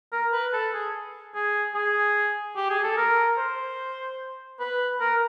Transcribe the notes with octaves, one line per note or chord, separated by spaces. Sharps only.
A#4
B4
A4
G#4
G#4
G#4
G4
G#4
A4
A#4
C5
B4
A#4